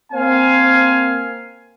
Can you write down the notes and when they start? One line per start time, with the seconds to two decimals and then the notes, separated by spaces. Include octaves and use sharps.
0.13 A#3 C4 C5 F5 G#5